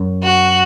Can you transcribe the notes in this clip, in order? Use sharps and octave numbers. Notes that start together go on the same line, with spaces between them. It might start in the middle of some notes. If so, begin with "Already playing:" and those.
Already playing: F#2
F#4